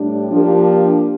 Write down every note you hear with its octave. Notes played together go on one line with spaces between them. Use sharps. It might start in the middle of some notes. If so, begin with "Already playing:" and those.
Already playing: A2 G3 D4 G4
F3 A#3 D4 G4 A#4